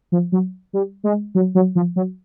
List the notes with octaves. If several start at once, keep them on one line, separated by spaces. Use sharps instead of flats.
F3
F#3
G3
G#3
F#3
F#3
F3
F#3